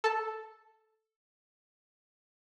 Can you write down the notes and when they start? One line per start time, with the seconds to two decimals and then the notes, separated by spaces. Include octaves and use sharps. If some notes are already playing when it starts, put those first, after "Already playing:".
0.04 A4 A5